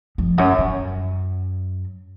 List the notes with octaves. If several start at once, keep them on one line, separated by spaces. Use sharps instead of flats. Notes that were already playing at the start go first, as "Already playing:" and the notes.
F2
F#2
F#2